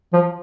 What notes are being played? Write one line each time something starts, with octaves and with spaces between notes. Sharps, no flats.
F3